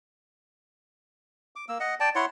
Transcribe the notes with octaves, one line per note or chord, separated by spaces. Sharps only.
D6
A#3 E6
D#5 F#5
D5 G5 A5
E4 C#5 F#5 C6